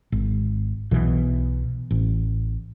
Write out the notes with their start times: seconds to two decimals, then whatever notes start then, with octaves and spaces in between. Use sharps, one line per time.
0.12 G#1
0.91 B1 B2 E3
1.91 A1